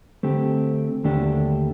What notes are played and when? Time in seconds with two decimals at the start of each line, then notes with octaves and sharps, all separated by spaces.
0.23 D3 A3 C4 G4
1.04 D#2 D3 A3 D4 G4